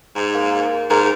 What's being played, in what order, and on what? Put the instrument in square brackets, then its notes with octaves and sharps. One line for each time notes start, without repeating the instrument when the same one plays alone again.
[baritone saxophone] G#2
[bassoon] A#3
[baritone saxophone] G#2 [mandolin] A#4